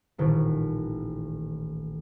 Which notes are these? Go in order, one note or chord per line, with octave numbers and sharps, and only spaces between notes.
D#1 A1 D#3 A3